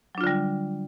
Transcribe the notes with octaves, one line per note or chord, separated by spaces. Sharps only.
D3 F#3 G3 D4 F4